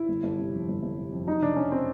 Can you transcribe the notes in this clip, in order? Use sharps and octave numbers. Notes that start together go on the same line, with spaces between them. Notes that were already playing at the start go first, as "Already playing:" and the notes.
Already playing: E4
G1
G1
C3
F2
G1
G1
C3
F2
F#3 D#4
F1 D4
C#3 C#4
C4